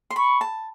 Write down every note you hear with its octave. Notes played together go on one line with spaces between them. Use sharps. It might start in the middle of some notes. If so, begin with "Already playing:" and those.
C6
B5 C#6
A5